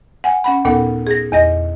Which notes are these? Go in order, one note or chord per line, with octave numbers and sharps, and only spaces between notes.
F#5 G#5
C#4 F#5 B5
D#2 A#2 B3 A4 F#5
G#4 A#6
E2 D#5 A#6